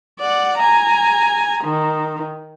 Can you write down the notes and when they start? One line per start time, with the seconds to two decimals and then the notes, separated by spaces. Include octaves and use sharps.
0.20 D5 F#5
0.58 G#5 A#5
1.64 D#3